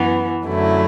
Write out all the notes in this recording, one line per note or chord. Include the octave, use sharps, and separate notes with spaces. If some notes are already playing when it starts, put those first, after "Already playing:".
Already playing: F#2 E3 B3
F#2 D3 F#3 A3 E4